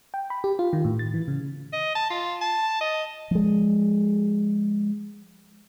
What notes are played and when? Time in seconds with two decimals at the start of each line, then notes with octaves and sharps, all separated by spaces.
0.14 G5
0.30 B5
0.44 G4
0.59 F4
0.73 D#3
0.85 A2
0.99 A6
1.14 E3
1.28 C#3
1.73 D#5
1.95 A5
2.10 F4
2.41 A5
2.81 D#5
3.31 F3 G#3